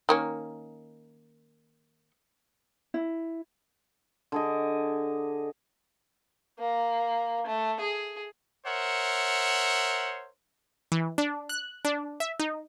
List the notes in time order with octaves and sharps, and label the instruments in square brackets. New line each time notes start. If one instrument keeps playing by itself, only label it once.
[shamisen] D#3 A#3 C#4
[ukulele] E4
[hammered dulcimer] D3 G#4 D#5
[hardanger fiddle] A#3
A3
G#4
[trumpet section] A#4 C5 C#5 E5 F#5
[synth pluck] E3
D4
F#6
D4
E5
D#4